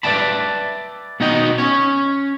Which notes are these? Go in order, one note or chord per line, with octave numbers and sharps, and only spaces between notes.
B4 D5 E5 G5 A5 B5
B2 B3 D#4 F#4 D#5 G5
C#4 C#5